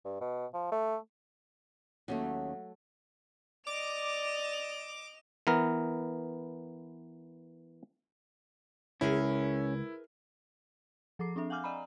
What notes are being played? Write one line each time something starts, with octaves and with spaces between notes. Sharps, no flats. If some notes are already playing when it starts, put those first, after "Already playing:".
G2
B2
F3
A3
D#2 F#3 A3 C#4
D5 D#5 D6 F7
E3 B3 A#4
C#2 C#4 E4 G#4 A#4 B4
F3 G#4 A4 D6 C7
C4 D4 A4 E5
F5 F#5 G#5 D6 F6 G6
D5 D#5 G#5 A#5 B5